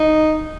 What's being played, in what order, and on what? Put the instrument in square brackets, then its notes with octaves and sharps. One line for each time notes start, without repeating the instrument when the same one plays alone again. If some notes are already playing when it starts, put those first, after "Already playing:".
Already playing: [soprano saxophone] D#4